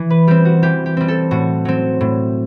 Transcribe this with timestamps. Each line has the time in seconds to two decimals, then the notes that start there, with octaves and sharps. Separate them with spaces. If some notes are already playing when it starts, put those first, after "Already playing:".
Already playing: E3
0.10 B4
0.27 G3 C4 G4
0.45 F#4
0.62 E3 G4
0.86 G4
0.97 G3 C4
1.08 A4
1.31 A2 F#4
1.65 F#3 C4
2.01 A2